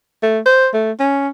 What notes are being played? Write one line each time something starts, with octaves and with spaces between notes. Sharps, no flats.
A3
C5
A3
C#4